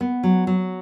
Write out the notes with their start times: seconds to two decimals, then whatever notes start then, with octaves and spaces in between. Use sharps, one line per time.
0.01 B3
0.23 F#3
0.47 F#3